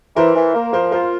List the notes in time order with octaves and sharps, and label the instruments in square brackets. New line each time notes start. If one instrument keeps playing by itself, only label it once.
[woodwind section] E3 [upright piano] A#4 C5
[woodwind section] E3
A#3
[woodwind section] F3 [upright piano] A#4 C5
[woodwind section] F4 [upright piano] A#4 C5